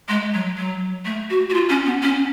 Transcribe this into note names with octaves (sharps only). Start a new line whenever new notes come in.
G#3
F#3
F#3
A3
F#4
F#4
F4
C#4
B3
C#4